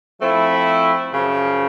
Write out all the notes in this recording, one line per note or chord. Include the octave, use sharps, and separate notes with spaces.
F3 A3 C4 E4
F#2 C#3 F3